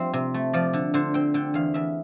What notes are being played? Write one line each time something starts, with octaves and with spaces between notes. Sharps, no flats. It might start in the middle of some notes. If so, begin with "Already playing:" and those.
Already playing: F3 G3 C4 D4 E5
C3
A3
F3 D5
D3
D3 C5
C4 G5
D3 G5
E2 F5
E2 E5